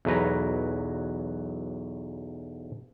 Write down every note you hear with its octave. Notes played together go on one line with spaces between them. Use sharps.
B1 E2 F#3 B4 A#5